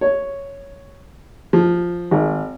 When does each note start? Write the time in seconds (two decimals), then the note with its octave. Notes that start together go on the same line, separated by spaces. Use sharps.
0.01 C#5
1.53 F3
2.11 G#1